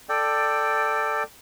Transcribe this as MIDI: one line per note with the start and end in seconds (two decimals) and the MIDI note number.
0.09 1.23 69
0.09 1.23 74
0.09 1.23 79